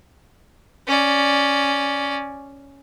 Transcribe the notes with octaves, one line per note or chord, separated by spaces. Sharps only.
C#4 D5